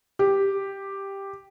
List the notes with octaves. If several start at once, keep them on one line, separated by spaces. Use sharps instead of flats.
G4